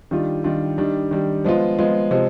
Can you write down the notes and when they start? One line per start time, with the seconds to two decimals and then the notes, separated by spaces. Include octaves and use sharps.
0.11 D#3 G3 D4 F4
0.44 D#3 G3 D4 F4
0.78 D#3 G3 D4
1.11 D#3 G3 D4
1.45 F3 G#3 B3 F4
1.78 F3 G#3 B3 F4
2.11 C3 F3 G#3